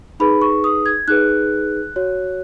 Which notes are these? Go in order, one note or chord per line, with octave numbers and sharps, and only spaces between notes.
D#4 G#4 B4 B5
C#6
D#6
G#6
D#4 G#4 B4 F#6
F#4 C#5